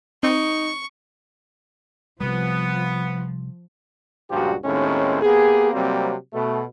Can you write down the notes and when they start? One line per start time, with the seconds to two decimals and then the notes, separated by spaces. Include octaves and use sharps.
0.23 C4 D#4 C#6
2.21 C3 F3 G3 B3
4.31 C#2 G2 A#2 F3 F#4 G4
4.65 D#2 A2 D#3 G#3 C4 C#4
5.22 A#3 B3 G4 G#4
5.73 C3 F#3 G3 A#3 C4
6.33 B2 A3